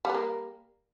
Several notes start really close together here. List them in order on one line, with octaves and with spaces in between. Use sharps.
G3 B3 A#3